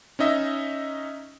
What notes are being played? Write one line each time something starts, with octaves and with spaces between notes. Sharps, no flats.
C#4 D#4 D#5 E5